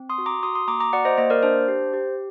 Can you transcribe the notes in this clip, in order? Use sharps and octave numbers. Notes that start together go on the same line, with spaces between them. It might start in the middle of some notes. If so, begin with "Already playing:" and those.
Already playing: C4
C6 D#6
F#4
A#5 D6
F#4 C6 D#6
C6 D#6
A#3 A#5 D6
A#5 D6
F#4 D5 F#5
C5 D#5
A#3 C5 D#5
A#4 D5
D4 C5
G4
G4